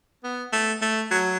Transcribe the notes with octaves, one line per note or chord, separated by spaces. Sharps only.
B3
A3
A3
F#3